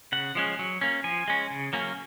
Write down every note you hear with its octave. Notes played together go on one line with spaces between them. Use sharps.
C#3 F#5
F3 G#3 C#4
F#3
A#3 C#4
F3 G#5
G#3 C#4
C#3
F#3 A#3 C#4